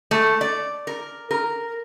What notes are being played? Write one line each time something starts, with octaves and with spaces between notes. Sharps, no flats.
A3
D5
A#4
A#4